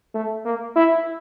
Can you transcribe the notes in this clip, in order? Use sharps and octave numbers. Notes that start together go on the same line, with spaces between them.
A3
A#3
E4